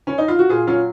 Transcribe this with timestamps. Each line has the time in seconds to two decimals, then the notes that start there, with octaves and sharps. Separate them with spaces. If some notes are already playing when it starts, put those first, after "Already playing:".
0.07 C#4
0.18 D#4
0.28 F4
0.39 F#4
0.49 A#2 F4 G#4
0.67 F#3 C#4 F4